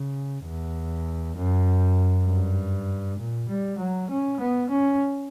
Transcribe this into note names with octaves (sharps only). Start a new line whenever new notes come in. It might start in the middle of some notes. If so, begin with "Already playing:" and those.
Already playing: C#3
E2
F#2
G2
A#2
G3
F#3
C#4
B3
C#4